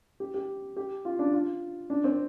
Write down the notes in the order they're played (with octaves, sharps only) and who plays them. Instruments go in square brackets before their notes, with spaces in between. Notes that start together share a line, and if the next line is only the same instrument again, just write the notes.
[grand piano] G4
G4
G4
F4
D4
F4
D4
C4